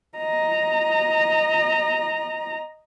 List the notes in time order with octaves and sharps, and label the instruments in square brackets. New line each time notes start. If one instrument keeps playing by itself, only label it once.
[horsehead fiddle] D#5 A#5